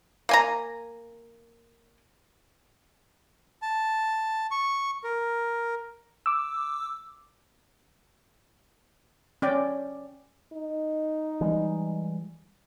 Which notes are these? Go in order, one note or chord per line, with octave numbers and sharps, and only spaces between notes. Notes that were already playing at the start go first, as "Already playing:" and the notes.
A#3 G#5 A#5
A5
C#6
A#4
D6 E6
C#4 D5 G5
D#4
E3 G3 G#3